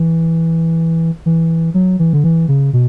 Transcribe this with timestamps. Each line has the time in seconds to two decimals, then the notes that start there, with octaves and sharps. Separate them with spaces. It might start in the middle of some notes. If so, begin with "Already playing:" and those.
Already playing: E3
1.26 E3
1.74 F#3
1.99 E3
2.13 D3
2.24 E3
2.48 C#3
2.73 B2